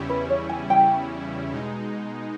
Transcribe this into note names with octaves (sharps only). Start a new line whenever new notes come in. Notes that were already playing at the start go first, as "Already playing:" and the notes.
Already playing: E2 C#3 G3 C#4 E4
B4
C#5
G#5
G5
B2 G#3 D#4